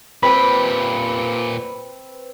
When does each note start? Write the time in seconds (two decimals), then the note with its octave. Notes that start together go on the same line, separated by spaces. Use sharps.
0.23 A#2 C4 G4 B4 B5